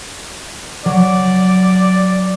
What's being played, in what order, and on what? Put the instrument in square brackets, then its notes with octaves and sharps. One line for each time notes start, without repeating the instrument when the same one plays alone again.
[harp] F#3 [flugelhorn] D5